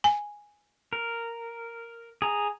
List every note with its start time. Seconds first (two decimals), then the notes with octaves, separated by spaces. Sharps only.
0.04 G#5
0.93 A#4
2.22 G#4 A#5